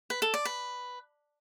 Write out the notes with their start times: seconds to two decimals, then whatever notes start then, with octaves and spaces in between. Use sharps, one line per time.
0.10 B4
0.22 A4
0.34 D5
0.45 B4